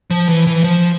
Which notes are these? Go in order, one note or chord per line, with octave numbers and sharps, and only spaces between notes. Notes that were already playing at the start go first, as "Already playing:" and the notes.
F3
E3
E3
F3